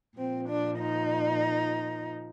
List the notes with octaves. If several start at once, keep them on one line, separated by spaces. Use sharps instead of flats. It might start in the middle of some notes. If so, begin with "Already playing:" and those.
A#2 F3 C4
D4
D#4